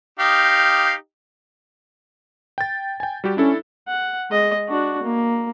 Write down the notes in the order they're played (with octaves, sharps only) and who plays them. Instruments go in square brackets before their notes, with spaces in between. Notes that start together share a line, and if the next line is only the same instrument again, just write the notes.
[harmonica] D#4 G4 F5
[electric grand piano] G5 A6
G5 G#5
G3 F#4 G4
[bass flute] C#4 [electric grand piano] D4 E4 A4
[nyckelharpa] F#5
G#3 D#5
D4 F#4
A#3